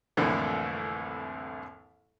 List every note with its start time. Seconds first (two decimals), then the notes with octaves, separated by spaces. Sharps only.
0.17 C2 F2 A2 D3 E3 A#3